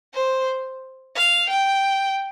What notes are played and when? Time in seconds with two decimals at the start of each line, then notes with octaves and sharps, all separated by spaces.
0.14 C5
1.16 F5
1.49 G5